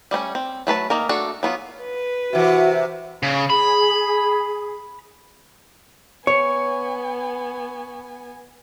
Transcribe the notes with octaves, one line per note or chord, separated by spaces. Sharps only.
G3 A3 C4 C#4
C4
F#3 A3 B4 A5
D#3 A#3 A#4
A3 D4 F#4 A4
F#3 B3 F4
B4
C3 E3 F#4 E5
C#3
G#4 B5
B3 C#5 G#5 C#6